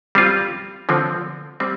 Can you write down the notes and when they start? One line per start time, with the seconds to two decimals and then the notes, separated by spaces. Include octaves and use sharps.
0.15 G3 C4 F4
0.89 D3 F3 C4
1.60 G3 C4